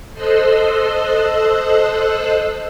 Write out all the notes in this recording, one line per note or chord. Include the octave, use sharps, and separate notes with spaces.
A4 C5 D#5 C6 E6 F#6